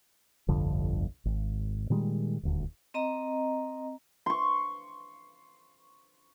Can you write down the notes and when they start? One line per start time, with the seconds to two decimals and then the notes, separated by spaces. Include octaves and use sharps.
0.48 G1 C2 F2 D3
1.25 G#1
1.90 A#2 D#3 G3 G#3
2.43 D#1 D2
2.94 C4 D#5 A#5
4.26 C6 C#6